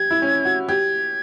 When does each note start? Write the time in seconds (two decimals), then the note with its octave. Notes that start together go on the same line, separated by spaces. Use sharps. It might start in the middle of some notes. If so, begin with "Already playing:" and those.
Already playing: G4 G#6
0.11 E4
0.22 C#4
0.45 F#4
0.69 G4 G#6